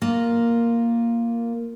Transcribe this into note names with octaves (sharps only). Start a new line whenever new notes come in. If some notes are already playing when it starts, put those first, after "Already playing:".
A#3 F4